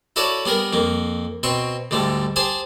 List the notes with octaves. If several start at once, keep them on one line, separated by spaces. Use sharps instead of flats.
E4 F#4 A4 C#5 D5
G3 B3 G#4 A#4
F2 A#3
B2 C4 C6 C#6
D2 G#2 G3 A3
G4 G#4 C5 G#5 A5